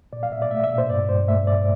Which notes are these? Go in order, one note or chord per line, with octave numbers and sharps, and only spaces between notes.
A#2 D5
F5
A#2 E5
D5
A3 E5
E5
A#2
C5
G2 D5
G2 C5
A3 E5
G2 D5